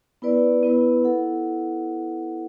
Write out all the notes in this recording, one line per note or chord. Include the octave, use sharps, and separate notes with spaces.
B3 E4 B4 D5
B3 E4 B4
E4 A4 F#5